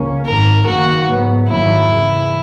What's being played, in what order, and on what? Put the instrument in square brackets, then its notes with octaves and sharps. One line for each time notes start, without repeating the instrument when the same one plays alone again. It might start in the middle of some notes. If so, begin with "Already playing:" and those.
Already playing: [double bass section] C#2 A#3 C#4
[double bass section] G#1 F#2 D#3 [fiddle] A#4
[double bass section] F#1 F#2 D#3 A#3 [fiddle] F#4
[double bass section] G#2 F#3 B3
[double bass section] G#1 F#2 D#3 F#3 A#3 [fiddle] E4
[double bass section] E2 C#3 E3